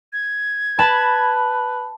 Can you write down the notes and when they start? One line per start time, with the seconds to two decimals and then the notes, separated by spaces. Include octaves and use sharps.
0.13 G#6
0.79 B4 A5 B5